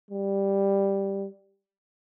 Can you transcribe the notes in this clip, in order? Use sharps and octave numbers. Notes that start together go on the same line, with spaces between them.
G3